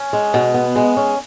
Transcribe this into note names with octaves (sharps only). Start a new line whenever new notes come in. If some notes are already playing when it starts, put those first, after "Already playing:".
Already playing: C#4
G#3
B2
B3
G#3
C#4